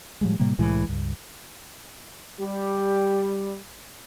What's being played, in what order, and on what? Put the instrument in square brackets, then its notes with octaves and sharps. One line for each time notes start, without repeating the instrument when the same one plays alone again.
[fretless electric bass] A2 F3 G3 G#3
A2 C3 G3 A#3
C2 A2 E3 G#3
C#2 G2
[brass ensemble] G3 [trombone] G4